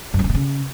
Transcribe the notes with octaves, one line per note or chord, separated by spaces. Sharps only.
F#2
F3
D3
B2
C#3